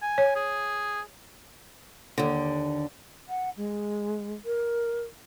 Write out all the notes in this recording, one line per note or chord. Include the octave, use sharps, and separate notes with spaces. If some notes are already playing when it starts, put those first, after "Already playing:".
G#5
C#5
G#4
D#2 D3
F#5
G#3
A#4